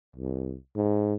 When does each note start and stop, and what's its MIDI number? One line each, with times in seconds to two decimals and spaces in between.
0.16 0.55 36
0.76 1.14 44